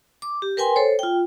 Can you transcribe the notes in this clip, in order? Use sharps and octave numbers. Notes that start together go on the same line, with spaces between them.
D6
G4
A#4 B4 G5 G#5 C6
A4 C5 C#5
F4 G5